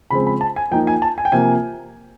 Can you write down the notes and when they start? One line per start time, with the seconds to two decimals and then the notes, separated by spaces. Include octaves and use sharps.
0.10 C#3 F3 G#3 C4 B5
0.27 B5
0.41 A5
0.56 G#5
0.71 F3 A#3 D#4 G5
0.87 G#5
1.02 A5
1.18 G#5
1.25 G5
1.32 C3 F3 A#3 G#5